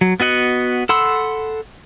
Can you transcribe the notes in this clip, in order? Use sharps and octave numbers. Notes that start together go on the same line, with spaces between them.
F#3
B3 F#4 D#5 F#5
A4 F#5 B5 C6 E6